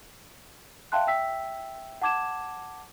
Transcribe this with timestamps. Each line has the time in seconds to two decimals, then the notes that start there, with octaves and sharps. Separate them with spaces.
0.92 E5 F5 G5 A5 C6 F#6
1.07 E5 G5 E6 B6
2.02 F#5 A5 D6 G#6 E7